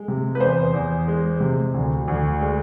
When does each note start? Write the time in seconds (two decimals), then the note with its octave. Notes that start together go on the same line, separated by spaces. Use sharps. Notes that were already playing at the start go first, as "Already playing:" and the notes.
Already playing: G#3
0.08 C3
0.35 B4
0.40 E2 C5
0.74 E2
1.08 G#3
1.40 C3
1.74 D2
2.08 D2
2.41 G#3